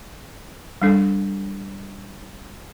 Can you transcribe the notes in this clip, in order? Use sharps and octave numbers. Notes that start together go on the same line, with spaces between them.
G3 D4 A4